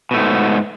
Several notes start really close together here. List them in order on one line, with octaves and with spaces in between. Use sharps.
B2 A3 G#2